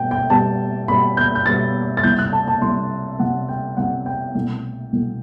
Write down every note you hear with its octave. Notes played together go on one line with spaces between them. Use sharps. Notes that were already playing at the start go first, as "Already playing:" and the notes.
Already playing: B2 G3 B3 G5
G5
B2 G3 B3 A5
B2 G3 B3 B5
G6
G6
B2 G3 B3 A6
A6
C2 C3 G3 G6
F#6
A5
A5
C2 C3 G3 C6
C2 C3 G3 F#5
G5
C2 C3 G3 F#5
G5
C2 B2 A3
C2 B2 A3